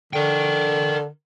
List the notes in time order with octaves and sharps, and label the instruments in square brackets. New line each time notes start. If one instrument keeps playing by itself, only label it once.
[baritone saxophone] D3 [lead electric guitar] A#4 G5